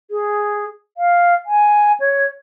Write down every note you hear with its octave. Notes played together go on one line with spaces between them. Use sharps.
G#4
F5
G#5
C#5